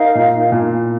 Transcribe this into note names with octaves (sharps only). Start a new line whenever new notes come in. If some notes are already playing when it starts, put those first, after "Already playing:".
Already playing: D#4 A#4 F5
A#2
A#2